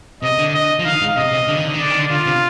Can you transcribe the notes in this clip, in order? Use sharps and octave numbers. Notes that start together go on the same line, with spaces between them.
C3 D#5
D3
D#5
F3
D#3 F5
G#2
C3 D#5
C3
D3
D#3
D3
D#3
D3 D5
D#3
D3
D3 F4
C3